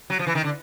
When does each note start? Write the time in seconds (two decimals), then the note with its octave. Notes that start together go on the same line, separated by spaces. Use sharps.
0.10 F#3
0.19 F3
0.27 E3
0.35 D#3
0.44 D3